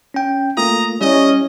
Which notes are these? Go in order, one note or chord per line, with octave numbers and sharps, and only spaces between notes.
C#4 G5
A3 A#3 F4 A#5 D#6
G3 C#4 E4 C#5 D#5